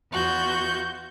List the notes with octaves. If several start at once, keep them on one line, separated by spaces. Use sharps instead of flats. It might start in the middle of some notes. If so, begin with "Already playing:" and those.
E2 F4 F#4 G6